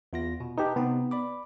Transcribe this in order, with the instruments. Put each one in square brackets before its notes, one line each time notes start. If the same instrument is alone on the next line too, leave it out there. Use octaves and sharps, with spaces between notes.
[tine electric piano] E2 F4 A#6
B2
[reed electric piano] D#4 G4 [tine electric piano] B4 A5
[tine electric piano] C3 C4 D#4 [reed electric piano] B3
[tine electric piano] D5 B5 D6